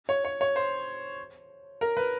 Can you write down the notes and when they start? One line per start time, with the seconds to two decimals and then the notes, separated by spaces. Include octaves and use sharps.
0.09 C#5
0.25 C#5
0.41 C#5
0.56 C5
1.81 A#4
1.97 B4